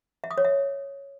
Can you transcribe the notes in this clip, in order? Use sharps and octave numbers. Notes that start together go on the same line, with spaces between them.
E5
D#6
C#5
E5